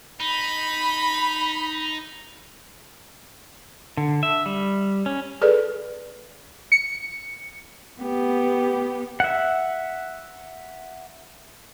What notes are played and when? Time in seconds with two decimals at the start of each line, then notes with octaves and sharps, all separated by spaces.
0.21 D#4 B5
3.97 D3
4.23 E5
4.46 G3
5.06 C#4
5.42 G#4 A4 B4 D5
6.72 C#7
8.02 B3 G4
9.20 E5 F#5